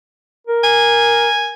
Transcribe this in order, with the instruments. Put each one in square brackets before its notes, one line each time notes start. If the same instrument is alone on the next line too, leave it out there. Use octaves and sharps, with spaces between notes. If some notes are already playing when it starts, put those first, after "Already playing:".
[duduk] A#4
[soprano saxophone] G#5